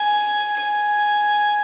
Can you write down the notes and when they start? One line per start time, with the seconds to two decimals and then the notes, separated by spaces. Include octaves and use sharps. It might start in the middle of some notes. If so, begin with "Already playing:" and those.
Already playing: G#5
0.58 G#5